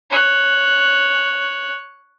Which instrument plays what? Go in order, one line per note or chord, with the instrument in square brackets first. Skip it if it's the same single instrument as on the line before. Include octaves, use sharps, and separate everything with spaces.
[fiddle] C#5 F#6